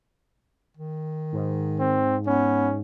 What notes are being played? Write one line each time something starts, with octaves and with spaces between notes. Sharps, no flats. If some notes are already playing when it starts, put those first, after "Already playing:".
D#3
G#2
C4
B3 C#4